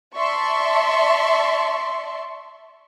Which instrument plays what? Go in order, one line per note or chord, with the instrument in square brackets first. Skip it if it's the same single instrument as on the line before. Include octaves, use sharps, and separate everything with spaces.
[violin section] D5 E5 A5 C6 C#6